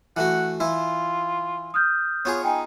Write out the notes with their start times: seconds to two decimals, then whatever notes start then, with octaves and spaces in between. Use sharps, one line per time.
0.17 E3 A3 F#4 F#5
0.60 E3 E4 F4
1.74 D#6 F6 G6
2.25 B3 F4 G#4 C#5
2.44 D#4 G5 G#5